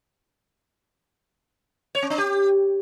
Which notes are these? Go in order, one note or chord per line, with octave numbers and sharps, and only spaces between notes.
C#5
C#4
D4
G4